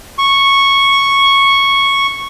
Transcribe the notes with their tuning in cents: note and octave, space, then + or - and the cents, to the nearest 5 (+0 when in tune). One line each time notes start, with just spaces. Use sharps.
C#6 -5